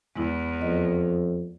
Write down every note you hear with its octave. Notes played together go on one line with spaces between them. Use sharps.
E2 G#3 E4
F2 D#5